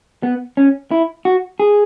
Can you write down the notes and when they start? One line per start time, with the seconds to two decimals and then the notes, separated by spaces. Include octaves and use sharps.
0.23 B3
0.57 C#4
0.91 E4
1.25 F#4
1.60 G#4